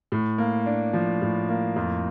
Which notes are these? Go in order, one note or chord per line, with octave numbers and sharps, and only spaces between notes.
A2
A#3
D4
F3
A2
A#3
F2